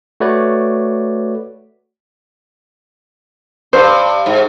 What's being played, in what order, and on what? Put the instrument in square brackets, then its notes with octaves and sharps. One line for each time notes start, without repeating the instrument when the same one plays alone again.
[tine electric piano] A3 F#4 B4 C#5 D5
[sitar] G2 [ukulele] C5
[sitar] G#2